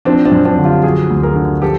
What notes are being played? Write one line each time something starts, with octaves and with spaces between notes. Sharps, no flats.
F3 C4 D4
C4 D4
F#2
C4 D4
D3
F4 G4
F3 F#4 G#4
D2
G#4 A#4
D3
F3 G4 A4